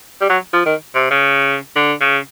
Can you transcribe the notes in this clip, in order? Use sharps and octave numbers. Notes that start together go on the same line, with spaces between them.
G3
F#3
F3
D#3
C3
C#3
D3
C#3